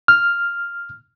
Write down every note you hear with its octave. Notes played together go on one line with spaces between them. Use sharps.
F6